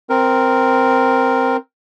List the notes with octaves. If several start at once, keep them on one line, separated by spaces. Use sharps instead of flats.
C4 A#4